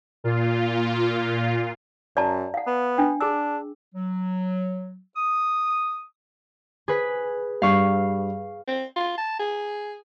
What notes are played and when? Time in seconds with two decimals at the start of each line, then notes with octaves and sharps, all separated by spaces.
0.24 A#2 F4
2.17 F#2 D5 A5 A#5
2.54 F5 F#5
2.67 B3
2.98 D4 G5
3.21 D4 G#4 E6
3.94 F#3
5.16 D#6
6.88 G#4 B4 B6
7.62 G2 F5 C#6 C7
8.68 C4
8.96 F4
9.18 A5
9.39 G#4